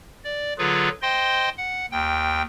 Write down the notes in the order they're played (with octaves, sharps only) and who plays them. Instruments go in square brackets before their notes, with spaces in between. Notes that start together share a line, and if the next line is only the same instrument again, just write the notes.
[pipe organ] D5
D3 F#3 F4 G#4 B4
C5 D#5 G5 C6
F#5
D#2 G5